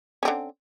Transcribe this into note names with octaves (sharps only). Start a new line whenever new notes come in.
D3 C4 C#4